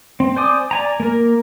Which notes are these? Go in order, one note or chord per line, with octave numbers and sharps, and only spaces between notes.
C4
C5 D5 G#5 D6 D#6
D5 G#5 A#5
A#3 A#4